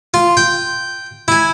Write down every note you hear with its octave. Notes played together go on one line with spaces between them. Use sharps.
F4
G5
E4 G#5